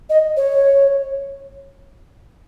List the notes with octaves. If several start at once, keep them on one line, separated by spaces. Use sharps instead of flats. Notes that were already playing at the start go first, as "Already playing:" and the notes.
D#5
C#5